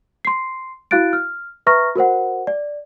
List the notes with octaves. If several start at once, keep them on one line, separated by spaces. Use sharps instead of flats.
C6 C7
E4 F#4 F5 F#6 A6 D7
F6
B4 E5 A#5 C#6 F6 A#6
F#4 A#4 C5 F#5
D5